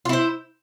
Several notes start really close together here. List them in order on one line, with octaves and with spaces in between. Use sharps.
F4 E4 C5